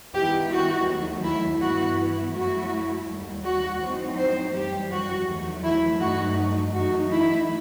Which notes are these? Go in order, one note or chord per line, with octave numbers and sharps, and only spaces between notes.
D#3 G3 B3 E4 G4
F#4
D#2 D#3 F#3 A3
E4
G2 E3 B3 E4 F#4
F#2 F#3 A3 E4 F#4
D#2 D#3 G3
F#4
A2 F#3 C4 D#4
C5
F#2 E3 G3 G4
F#4
E2 D#3 F#3 A3
E4
G2 F#3 A3 D#4 F#4
F#2 E3 A3 D#4 F#4
E4